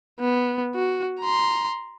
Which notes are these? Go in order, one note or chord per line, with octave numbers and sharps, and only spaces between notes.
B3
F#4
A#5 C6